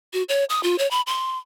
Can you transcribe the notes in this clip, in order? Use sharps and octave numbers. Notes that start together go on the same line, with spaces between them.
F#4
C#5
D#6
F4
C#5
B5
C6